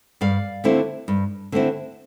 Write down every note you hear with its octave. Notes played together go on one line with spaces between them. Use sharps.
G2 D5 F5
D3 A3 C4 E4
G2
D3 A3 C4 E4